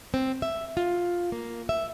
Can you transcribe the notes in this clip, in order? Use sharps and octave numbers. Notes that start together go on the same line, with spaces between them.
C4
E5
F4
A#3
E5